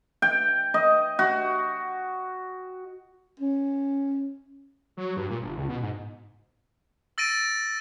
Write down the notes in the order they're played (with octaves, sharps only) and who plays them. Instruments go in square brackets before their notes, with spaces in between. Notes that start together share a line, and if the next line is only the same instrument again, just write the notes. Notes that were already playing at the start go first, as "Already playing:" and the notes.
[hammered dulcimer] G5
D#5
F#4
[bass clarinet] C#4
[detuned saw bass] F#3
G2
A#2
G1
C#2
B2
G#2
[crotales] E6 A6 A#6 D7 D#7